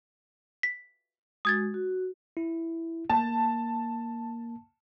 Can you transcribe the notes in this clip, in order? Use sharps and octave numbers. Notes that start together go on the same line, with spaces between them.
B6
G#3 F#4 D#6 G#6 A6
F#4
E4
A#3 A5